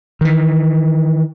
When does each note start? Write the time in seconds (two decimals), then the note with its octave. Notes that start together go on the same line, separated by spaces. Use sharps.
0.21 D#3 E3